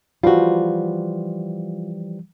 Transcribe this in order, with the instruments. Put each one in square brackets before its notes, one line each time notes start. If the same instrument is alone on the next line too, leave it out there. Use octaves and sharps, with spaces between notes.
[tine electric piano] E3 F3 G3 [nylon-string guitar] F4 F#4